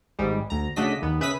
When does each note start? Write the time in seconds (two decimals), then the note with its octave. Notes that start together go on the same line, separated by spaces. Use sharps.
0.19 G#1 G#2 G3 G#3
0.50 D2 A#5
0.76 C#3 A3 D4 F#4 D#5 B6
1.02 D#2 B3
1.20 C#3 B4 E5 D#6 B6